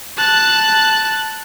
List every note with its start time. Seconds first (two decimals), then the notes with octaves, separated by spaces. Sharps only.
0.17 A5 F#6